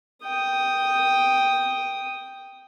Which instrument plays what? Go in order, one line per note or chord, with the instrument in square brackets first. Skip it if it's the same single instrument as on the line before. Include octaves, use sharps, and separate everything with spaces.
[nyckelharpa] G5 D#6